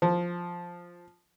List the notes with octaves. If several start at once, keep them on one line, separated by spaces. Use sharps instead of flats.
F3